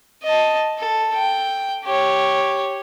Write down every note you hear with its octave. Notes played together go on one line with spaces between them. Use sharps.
D#5 A5
A4
G5
G4 C#5